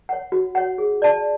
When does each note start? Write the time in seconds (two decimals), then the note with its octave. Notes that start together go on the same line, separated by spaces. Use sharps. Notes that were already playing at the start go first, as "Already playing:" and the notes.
0.09 C#5 F#5
0.32 F#4
0.55 C#5 F#5
0.78 G#4
1.02 D5 A5